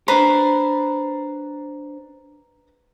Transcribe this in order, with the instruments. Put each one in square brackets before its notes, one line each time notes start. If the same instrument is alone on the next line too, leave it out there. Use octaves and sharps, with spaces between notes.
[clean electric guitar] D4 C5 [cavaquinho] B4 A#5 B5